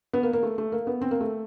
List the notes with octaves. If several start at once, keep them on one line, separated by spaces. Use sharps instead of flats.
B3
A#3
A#3
A3
A3
A#3
B3
C4
A#3
A3